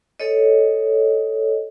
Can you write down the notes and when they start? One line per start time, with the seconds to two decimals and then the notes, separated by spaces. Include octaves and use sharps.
0.20 A4 C#5 D#5